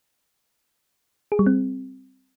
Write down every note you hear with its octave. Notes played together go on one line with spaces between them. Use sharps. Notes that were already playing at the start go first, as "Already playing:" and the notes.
G#4
G3
C4